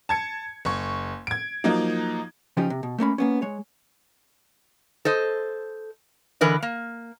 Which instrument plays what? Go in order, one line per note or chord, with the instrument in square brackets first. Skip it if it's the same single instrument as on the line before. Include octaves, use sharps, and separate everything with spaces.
[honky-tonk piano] A5 G#6 C#7
F#1 C#6
G#6 D7
F3 F#3 A#3 D#4
[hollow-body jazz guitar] C#3 F3 C#4 D#4 F4 G4
C3
B2
A3 A#3 C#4 B5
A#3 B3 C#4
G#3 C#5
[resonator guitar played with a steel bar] A4 C5 D#5
D3 E3 A#4 B4 D#5
A#3